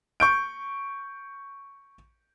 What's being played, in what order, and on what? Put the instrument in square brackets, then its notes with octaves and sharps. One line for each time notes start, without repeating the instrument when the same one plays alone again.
[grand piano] C#6 G6 D7